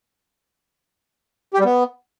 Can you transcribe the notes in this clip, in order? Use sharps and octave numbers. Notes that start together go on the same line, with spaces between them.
G4
G3
B3